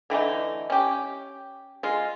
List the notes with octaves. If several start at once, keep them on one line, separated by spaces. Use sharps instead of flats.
D3 E3 A3 D#4
C#4 G4
G#3 F4